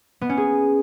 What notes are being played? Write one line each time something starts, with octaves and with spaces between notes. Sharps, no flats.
B3
C#4
G#4